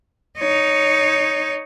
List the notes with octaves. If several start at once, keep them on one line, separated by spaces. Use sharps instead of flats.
D#4 C#5